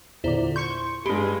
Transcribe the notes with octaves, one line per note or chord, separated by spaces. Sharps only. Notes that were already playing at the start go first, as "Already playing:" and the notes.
E2 A#2 D3 E4 C5
C6 C#6 G6 C#7
G2 G#3 G4 B5